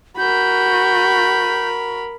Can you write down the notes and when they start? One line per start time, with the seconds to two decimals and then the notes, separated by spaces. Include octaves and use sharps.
0.18 F#4 A#4 B5 G6